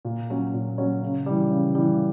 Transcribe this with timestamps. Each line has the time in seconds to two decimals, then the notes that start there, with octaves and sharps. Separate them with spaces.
0.05 A#2
0.30 F#3 C#4
0.54 A#2
0.78 F#3 C#4
1.02 C#3
1.26 E3 G3
1.51 C#3
1.75 E3 G3